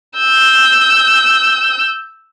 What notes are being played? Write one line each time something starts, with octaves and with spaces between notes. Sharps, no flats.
E6 G6